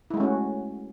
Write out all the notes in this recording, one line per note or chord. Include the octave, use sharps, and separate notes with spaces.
G#3 A3 C#4 E4 F#4